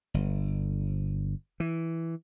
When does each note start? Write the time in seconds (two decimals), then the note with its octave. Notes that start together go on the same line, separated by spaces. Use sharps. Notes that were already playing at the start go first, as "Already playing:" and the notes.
0.14 G1
1.60 E3